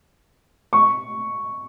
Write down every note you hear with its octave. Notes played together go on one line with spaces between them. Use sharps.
C#6